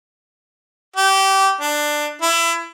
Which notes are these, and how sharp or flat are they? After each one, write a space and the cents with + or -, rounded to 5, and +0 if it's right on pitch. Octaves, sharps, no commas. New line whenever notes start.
G4 -20
D4 +15
E4 +25